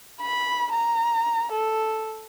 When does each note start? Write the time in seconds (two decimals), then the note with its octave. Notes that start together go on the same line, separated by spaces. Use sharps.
0.21 B5
0.72 A#5
1.52 A4